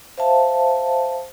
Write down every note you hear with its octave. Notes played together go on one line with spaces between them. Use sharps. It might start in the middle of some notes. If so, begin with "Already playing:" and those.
C5 E5 F5 A5